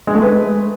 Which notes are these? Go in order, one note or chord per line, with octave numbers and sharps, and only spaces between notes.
G#3
A3
B4